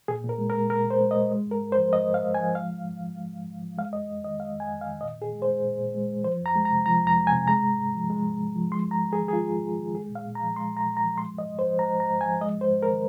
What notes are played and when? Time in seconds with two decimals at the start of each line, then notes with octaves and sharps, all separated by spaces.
0.08 A#2 G#4
0.24 A#2
0.29 A#4
0.38 G#3
0.50 A#4
0.54 G#3
0.70 A#2 A#4
0.85 A#2
0.90 C5
1.01 G#3
1.11 D#5
1.16 G#3
1.31 G#3
1.46 G#2
1.51 A#4
1.62 G#2
1.72 C5
1.77 F3
1.93 G#3 D#5
2.09 G#2
2.14 F5
2.24 G#2
2.35 G#5
2.39 F3
2.55 G#3 F5
2.70 G#2
2.85 G#2
3.01 F3
3.16 G#3
3.32 G#2
3.47 G#2
3.62 F3
3.78 G#3 F5
3.93 F2 D#5
4.09 F2
4.24 D#3 D#5
4.39 G#3 F5
4.55 F2
4.60 G#5
4.71 F2
4.81 F5
4.86 D#3
5.01 A#2 D#5
5.17 A#2 G#4
5.32 G#3
5.42 C5
5.48 G#3
5.63 A#2
5.79 A#2
5.94 G#3
6.09 G#3
6.24 F3 C5
6.41 F2 A#5
6.56 G#3
6.65 A#5
6.71 C3
6.86 F3 A#5
7.02 F2 A#5
7.17 G#3
7.27 G#5
7.32 C3
7.48 G#3 A#5
7.63 G#2
7.78 G#2
7.95 F3
8.10 G#3
8.25 G#2
8.41 G#2
8.56 F3
8.71 G#3 C6
8.86 G#2 A#5
9.02 G#2
9.13 G#4
9.18 D#3
9.28 G#4
9.32 G#3 F4
9.48 G#2
9.63 G#2
9.79 D#3
9.95 G#3 G#4
10.10 A#2
10.15 F5
10.25 A#2
10.35 A#5
10.41 F3
10.56 G#3 C6
10.72 A#2 A#5
10.87 A#2
10.97 A#5
11.03 F3
11.17 G#3 C6
11.34 G#2 D#5
11.49 G#2
11.59 C5
11.64 F3
11.79 G#3 A#5
11.95 G#2
12.00 A#5
12.11 G#2
12.21 G#5
12.25 F3
12.41 G#3 D#5
12.56 G#2 C5
12.71 G#2
12.82 A#4
12.88 D#3